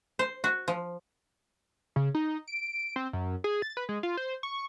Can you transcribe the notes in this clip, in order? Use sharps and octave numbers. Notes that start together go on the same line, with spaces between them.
C5
F#4
F3
C#3
D#4
D7
C4
F#2
G#4
A6
B4
G#3
F4
C5
C#6